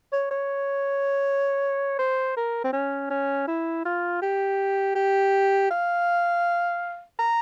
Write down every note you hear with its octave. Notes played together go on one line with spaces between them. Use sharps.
C#5
C#5
C5
A#4
C4
C#4
C#4
E4
F4
G4
G4
F5
A#5